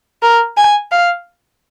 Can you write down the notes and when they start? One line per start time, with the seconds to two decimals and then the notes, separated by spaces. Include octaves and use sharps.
0.23 A#4
0.57 G#5
0.91 F5